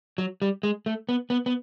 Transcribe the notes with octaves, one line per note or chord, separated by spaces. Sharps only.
F#3
G3
G#3
A3
B3
B3
B3